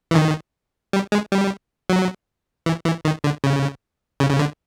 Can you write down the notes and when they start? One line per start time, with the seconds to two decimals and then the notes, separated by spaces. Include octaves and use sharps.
0.11 E3
0.15 D#3
0.93 G3
1.12 G#3
1.32 G3
1.90 F#3
2.66 E3
2.85 E3
3.05 D#3
3.24 D3
3.44 C#3
4.20 C#3
4.30 C#3
4.39 D3